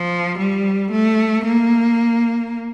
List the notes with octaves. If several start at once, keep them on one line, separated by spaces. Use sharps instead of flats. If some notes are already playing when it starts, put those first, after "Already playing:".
Already playing: F3
G3
A3
A#3